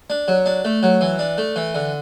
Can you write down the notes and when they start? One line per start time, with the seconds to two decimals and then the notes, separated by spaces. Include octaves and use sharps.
0.10 D4
0.28 F#3
0.46 D4
0.65 A3
0.83 F#3
1.01 E3
1.19 D4
1.38 A3
1.56 E3
1.75 D3